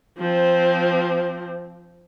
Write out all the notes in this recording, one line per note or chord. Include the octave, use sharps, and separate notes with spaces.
F3 C4